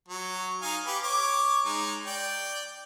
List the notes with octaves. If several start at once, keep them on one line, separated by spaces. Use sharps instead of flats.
F#3
D#4 F5 G#5
G4 B4
C#5 D6
G#3 D#4
D5 G5